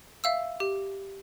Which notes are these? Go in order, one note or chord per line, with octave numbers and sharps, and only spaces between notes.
E5 F5 E6
G4